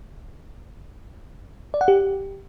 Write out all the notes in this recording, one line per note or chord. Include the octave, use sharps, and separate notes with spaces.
D5
F#5
G4